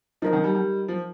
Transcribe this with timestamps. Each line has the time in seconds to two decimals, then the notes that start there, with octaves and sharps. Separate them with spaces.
0.22 F3 D#4 A#4 D#5
0.33 D#3
0.44 G3
0.55 G3
0.88 F3